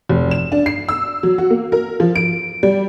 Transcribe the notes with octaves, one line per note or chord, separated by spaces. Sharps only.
F1
E7
D4
C7
E6
F#3
F#4
A#3
A#4
F3
D7
G3